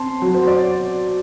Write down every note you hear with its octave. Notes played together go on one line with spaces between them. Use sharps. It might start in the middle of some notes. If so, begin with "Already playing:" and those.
Already playing: C4 A5 C6
F#3
C5
D5